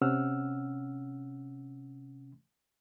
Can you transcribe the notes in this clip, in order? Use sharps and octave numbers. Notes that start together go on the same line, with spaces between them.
C3 C#4 F#5 E6 F6